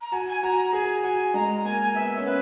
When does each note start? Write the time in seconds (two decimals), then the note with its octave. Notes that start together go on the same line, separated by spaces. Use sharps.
0.01 A#5
0.12 F#4 G#5
0.28 G#5
0.43 F#4 A#5
0.58 A#5
0.73 G#4 G#5
1.04 F#4 G#5
1.34 G#3 A#5
1.65 A#3 G#5
1.95 B3 E5
2.17 C#4
2.25 B3 B4